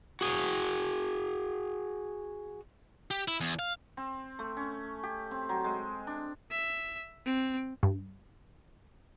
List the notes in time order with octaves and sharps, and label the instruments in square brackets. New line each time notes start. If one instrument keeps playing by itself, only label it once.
[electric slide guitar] F#4 G#4
[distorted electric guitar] G4
E4
E2
F5
[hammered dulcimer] C4
A3
C#4
G4
C4
F#3
G#3
D4
[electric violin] E5
C4
[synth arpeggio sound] G2